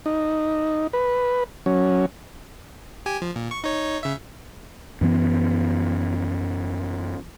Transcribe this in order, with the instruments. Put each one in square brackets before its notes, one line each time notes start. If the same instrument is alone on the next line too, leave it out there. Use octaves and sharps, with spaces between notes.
[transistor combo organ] D#4
B4
F#3 C#4
[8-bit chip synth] G4 G#5
F3
A#2
C#6
D#4 C#5
C#3 E5
[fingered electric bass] F#2 E3 B3